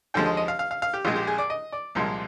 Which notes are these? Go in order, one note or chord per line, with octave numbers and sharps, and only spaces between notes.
D#2 D3 F3 G#3 G5
D#5
D#5
F5
F5
F5
F5
G4
A#1 A#2 G#3 F4
G4
G#4
D5
D#5
D5
C2 A#2 F3 G#3